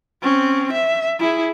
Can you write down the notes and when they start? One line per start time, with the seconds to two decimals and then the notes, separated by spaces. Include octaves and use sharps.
0.22 C4 C#4
0.73 E5
1.19 E4 G#4